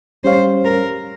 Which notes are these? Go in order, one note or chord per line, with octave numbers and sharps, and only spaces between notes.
G3 C#4 G4 C5 C#5 F5
A#4